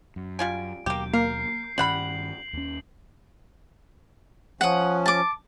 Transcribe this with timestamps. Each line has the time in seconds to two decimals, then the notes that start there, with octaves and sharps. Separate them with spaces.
0.16 F#2
0.39 G3 F4 G#5 D7
0.86 D#2 B2 F#3 A#3 G4 G6
1.14 A#3 A#4 C7
1.78 G2 D#3 G3 C#4 F#5 B5 F#7
2.53 D#2 C#4
4.61 F3 C#4 F#5 D#6
5.06 A5 D6